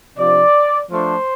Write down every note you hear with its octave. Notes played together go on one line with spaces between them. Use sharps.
C3 F3 D4 D5
F3 A3 D4 C5